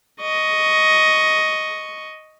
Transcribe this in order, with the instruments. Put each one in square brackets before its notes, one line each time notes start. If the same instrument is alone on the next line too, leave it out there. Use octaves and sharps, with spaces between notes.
[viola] D#5 C#6